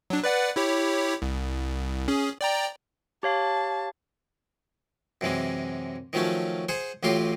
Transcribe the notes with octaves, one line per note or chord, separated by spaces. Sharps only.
F#3 D4
B4 D5 F#5
E4 G4 C#5
C2
C#4 G#4
D5 G5 A#5
G4 C#5 F5 A5
F#2 C3 E3 G#3
D#3 F3 F#3 A3 C#4
G#4 C5 F#5
A1 A2 F#3 F4 G4 C6